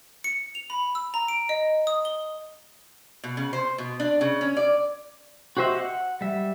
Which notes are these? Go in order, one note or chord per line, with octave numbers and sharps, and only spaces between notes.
C#7
F7
B5
E6
A#5
D7
D#5
D#6
G7
B2
C#3
C5
B2
D4
C#3
C#4
D5
F#4 G4 C5 D#5 E5
F#5
G3 E5